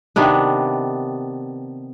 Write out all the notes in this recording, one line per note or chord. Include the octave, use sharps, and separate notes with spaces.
C3 D#3 B3 D4